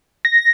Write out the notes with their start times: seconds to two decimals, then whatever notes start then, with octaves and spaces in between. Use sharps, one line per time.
0.25 A#6